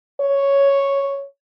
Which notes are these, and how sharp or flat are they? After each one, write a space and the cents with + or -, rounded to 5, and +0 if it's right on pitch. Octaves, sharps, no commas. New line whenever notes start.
C#5 +0